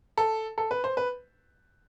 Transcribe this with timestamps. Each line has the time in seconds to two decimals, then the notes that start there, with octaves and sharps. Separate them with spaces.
0.18 A4
0.58 A4
0.71 B4
0.84 C5
0.97 B4